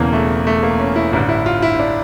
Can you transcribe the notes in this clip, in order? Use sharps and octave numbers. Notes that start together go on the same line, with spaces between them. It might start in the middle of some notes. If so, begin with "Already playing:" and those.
Already playing: E1 E2 C#3 E3 A#3
A3
A3
A#3
C#4
E4
A1 G2 D3 E4
E4
F4
E4
D4